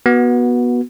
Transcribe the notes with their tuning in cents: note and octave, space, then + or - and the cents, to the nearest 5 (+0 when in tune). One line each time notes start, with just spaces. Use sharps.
B3 -20 F#4 +0